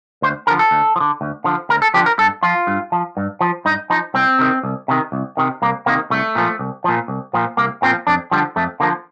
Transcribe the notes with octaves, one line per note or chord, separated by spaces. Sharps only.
D2 C5
D3 F3 A#4
A4
D2
F3
D3
D2
D3 F3
D2 A#4
A4
D3 F3 G4
A#4
G2 A4
F3 F4
G2
F3
G2
F3
G2 D#4
F3 D#4
C2 C4
C3 D#3
C2
C3 D#3
C2
C3 D#3
C2 A#3
C3 D#3 A#3
C2 A3
A#2 F3
C2
A#2 F3
C2
A#2 F3
C2 A#3
A#2 F3 C4
F2 D4
D3 F3 G3
F2 A3
D3 F3 A#3